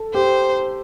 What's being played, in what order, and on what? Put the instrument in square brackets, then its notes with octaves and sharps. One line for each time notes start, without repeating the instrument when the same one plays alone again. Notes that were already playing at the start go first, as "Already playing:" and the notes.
Already playing: [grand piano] A4
[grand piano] G4 [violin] C5